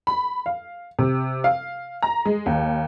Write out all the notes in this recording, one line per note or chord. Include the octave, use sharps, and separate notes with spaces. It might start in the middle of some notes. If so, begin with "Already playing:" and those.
B5
F5
C3
F5
A#5
G#3
D#2